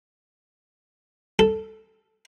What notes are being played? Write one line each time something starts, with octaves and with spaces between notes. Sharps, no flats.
A4